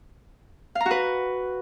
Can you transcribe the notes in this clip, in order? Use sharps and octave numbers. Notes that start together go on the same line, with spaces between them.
F5
A#5
F#4
B4